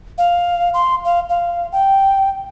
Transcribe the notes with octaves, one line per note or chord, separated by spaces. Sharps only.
F5
C6
F5
F5
G5